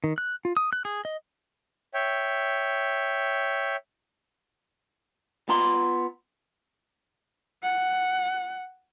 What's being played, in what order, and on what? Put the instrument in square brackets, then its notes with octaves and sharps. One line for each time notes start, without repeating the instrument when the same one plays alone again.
[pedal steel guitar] D#3
F#6
F4
D#6
F#6
G#4
D#5
[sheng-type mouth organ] C#5 E5 G5
[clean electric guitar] B3 F4 A#5 C6
[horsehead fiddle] F#5